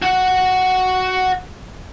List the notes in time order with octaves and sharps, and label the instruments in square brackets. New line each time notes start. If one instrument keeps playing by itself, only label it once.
[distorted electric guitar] F#4 F#5